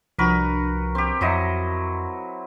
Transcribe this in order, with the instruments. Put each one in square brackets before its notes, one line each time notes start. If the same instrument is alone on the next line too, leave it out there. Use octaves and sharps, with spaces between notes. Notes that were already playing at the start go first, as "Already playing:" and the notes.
[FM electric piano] C2 F3 D4 [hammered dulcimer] F#4 A#4 B4
[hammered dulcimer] C4 G4
[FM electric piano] F2 [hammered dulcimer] F#3 E4 D#5